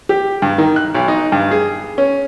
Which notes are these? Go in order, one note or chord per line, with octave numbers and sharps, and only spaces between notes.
G4
G2
D#3
F#6
B1
D#4
G2
G#4
C#4